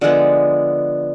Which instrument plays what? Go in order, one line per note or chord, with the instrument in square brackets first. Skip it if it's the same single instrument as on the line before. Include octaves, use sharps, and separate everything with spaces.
[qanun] D3 F3 G#3 B3